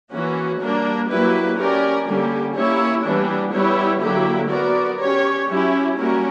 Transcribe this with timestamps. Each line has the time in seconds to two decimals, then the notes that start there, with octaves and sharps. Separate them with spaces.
0.12 E3 A#3 C#4 F#4
0.60 G3 A#3 D4 A#4
1.09 F#3 A#3 E4 G4 B4
1.59 C#4 G4 A#4 D5
2.07 D3 G3 A#3 C#4 G4
2.56 A#3 C#4 E4 G4 C#5
3.04 E3 G3 B3 D4 G4
3.53 G3 B3 E4 G4 C#5
4.02 D3 F#3 A#3 E4 G4
4.50 B3 F#4 A#4 D5
4.99 C#4 G4 C#5
5.48 F#3 C#4 E4 G4
5.98 G3 A#3 C#4 F#4 A#4